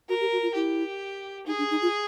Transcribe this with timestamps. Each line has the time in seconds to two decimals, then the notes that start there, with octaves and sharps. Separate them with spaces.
0.09 F#4 A#4
0.21 G4
0.32 F#4
0.43 F4
0.55 E4 G4
1.47 D#4 G#4
1.58 D4
1.71 D#4
1.82 F4